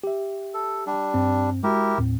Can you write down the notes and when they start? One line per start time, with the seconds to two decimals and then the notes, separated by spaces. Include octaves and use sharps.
0.04 G4 E5
0.54 A4
0.87 G3 D4
1.14 G2 C4
1.63 G#3 E4 F#4 G4 A#4
1.98 D#2 A2 C4